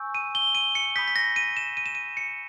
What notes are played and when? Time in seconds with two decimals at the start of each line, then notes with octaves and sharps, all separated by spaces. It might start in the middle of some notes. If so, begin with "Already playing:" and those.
Already playing: G#5 C#6 E6 G6
0.15 D#7
0.35 G7
0.55 D#7
0.75 C#7
0.96 B5 D#6 G6 B6
1.08 B6
1.16 A#6
1.36 D#7
1.57 E7
1.77 D#7
1.86 E7
1.95 D#7
2.17 C#7